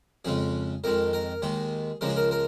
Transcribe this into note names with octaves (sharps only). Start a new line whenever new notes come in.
F2 C#3 G#3 G#4
F2 D#3 G#3 A#4
A#4
D#2 D#3 G#3 G#4
C#2 C#3 F3 G#3 A#4
G#4
A#4
A#4